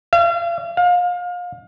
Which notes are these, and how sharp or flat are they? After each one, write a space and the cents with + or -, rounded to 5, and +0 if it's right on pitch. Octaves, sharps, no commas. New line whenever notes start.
F5 -40
F5 +30